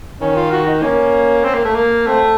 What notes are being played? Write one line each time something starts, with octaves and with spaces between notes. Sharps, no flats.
D#3 C#4
F4
F#4
D#4
A#3 C#4
C4
A#3
A3
A#3
A3 C4